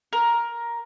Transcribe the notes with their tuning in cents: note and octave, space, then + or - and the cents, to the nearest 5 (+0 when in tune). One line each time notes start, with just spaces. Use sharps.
A#4 +10